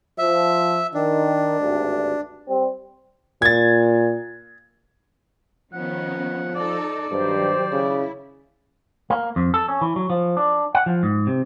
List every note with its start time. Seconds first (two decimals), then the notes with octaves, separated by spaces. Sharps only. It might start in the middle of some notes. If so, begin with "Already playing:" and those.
0.18 F3 E5
0.94 D#3 D4
1.59 G#1 D2 G2
2.48 G3 C4
3.42 A#2 G#6 A6
5.73 D#3 F3 B3 C#4 F#5
6.55 D#4 A4 D5
7.11 G2 D#3 F#3 G4 C5
7.72 C#3 E4
9.10 A#3
9.36 F2
9.54 A4
9.68 C#4
9.81 E3
9.96 F#3
10.10 F3
10.37 D4
10.75 F#5
10.86 F3
11.03 G#2
11.27 C3